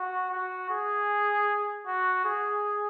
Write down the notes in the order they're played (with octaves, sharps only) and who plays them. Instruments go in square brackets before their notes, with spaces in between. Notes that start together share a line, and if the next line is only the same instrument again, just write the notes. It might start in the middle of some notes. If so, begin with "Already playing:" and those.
Already playing: [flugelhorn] F#4
F#4
G#4
F#4
G#4